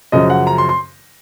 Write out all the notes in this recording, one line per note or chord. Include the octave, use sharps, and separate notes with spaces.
F#2 C#3 F3 D#5
F#5
A#5
C6
C6